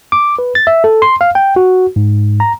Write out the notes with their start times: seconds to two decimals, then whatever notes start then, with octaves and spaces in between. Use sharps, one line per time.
0.12 D6
0.39 B4
0.55 A6
0.67 E5
0.84 A4
1.02 C6
1.21 F5
1.35 G5
1.56 F#4
1.96 G#2
2.40 A#5